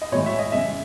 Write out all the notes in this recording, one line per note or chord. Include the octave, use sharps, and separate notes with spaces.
D#5
A2 E3 G#3 C#5
E5
D#5
C#3 G#3 E5